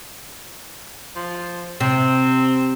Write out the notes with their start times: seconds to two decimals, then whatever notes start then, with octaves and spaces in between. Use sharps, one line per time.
1.15 F3
1.80 C3 C4